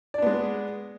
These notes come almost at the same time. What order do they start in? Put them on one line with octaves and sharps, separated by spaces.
D5 D4 B3 G#3